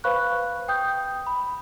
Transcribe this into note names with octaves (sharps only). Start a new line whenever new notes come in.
B4 C5 F5 B5 C#6 F#6
G5 D#6 G6
B5